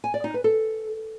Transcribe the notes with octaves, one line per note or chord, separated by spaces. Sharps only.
G#5
D5
D#4
B4
A4